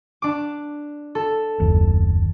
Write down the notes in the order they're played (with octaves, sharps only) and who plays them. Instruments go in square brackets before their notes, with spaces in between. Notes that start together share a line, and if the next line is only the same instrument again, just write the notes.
[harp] D4 D6
A4
[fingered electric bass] F#1 D#2